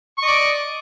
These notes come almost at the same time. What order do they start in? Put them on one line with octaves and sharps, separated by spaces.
C#6 D#5 D5